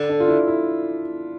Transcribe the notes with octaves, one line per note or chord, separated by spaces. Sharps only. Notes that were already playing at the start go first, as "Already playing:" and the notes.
Already playing: D3
D4
F4
E4
E4